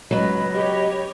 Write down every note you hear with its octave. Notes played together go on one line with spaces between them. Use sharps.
C#2 F#3 B3 D#5 B5
G4 B4 C#5